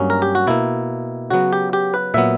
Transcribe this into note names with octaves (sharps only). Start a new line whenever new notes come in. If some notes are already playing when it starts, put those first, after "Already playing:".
Already playing: G2 F#3 A#3 C#4
A#4
G4
F#4
B2 A#3 E4
C#3 F#3 B3 F#4
G4
G4
B4
A#2 F#3 B3 E5